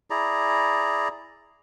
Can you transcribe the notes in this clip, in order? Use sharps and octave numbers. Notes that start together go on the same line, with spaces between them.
E4 G#4 D5 A#5